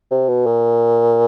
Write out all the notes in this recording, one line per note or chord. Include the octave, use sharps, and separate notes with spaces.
C3
B2
A#2